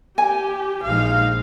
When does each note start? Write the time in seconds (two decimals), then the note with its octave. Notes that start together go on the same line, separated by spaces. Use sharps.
0.18 G4 G#5
0.83 A#1 G#3 D#4 F5